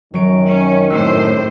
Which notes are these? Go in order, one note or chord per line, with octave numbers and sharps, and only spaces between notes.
F#2 D#3 F#3 D7
C#4
F#2 A2 C4 C5 E6 F#6